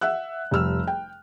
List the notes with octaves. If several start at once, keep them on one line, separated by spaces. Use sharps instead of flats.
E5 F#5 E6 F#6
F1 G3 E6 F6
G5